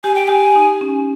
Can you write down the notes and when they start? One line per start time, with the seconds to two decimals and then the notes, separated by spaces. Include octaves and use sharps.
0.04 G4 G#5
0.15 G5
0.28 G4 G#5
0.55 D#4
0.81 C#4